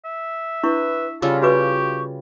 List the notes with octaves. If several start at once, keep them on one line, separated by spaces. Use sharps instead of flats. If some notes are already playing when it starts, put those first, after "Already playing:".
E5
D4 E4 B4 C#6
C#3 G3 F4 A4 F5 D6 E6
F#4 G4 B4 C#6 D6